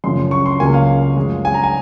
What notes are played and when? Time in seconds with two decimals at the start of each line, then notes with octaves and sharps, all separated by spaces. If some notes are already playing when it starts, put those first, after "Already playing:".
0.04 F#2 C#3 F3 C6
0.31 C#6
0.46 C6
0.60 C#2 C#3 F#3 A#3 G#5
0.74 F5
1.17 F#2 F3 G#3
1.45 G#5
1.54 A#5
1.64 G#5